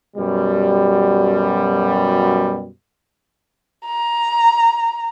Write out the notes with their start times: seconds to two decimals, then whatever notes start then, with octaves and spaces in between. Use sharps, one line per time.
0.16 F#2 B2 G3
3.86 A#5